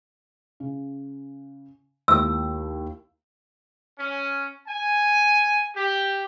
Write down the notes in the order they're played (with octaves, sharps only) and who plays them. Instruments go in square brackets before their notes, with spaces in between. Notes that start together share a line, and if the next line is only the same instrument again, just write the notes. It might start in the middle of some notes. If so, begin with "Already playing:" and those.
[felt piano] C#3
[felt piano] D#2 E4 [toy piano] E6
[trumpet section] C#4
G#5
G4